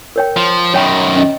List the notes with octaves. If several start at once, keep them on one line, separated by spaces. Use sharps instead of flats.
A#4 C#5 G5
F3
F#2 D#3 C#5 G5 B5
C#4 D#5